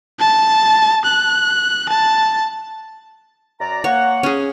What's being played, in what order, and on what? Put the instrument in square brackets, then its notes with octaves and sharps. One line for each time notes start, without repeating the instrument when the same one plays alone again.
[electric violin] A5
F#6
A5
[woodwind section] F#2 D5 A#5
[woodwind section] A#3 F#5 [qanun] C#5
[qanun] C#4 G#4